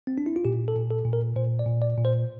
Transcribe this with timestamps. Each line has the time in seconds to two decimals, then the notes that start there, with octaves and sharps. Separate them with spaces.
0.07 C4
0.18 D4
0.26 E4
0.36 F4
0.45 A#2 G4
0.68 A4
0.76 A#2
0.91 A4
1.05 A#2
1.13 A#4
1.36 A#2 C5
1.59 D5
1.66 A#2
1.82 D5
1.97 A#2
2.05 C5